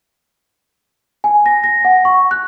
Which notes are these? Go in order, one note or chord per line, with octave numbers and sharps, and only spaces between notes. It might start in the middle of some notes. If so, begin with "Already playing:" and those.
G#5
A#6
A#6
F#5
C#6
F#6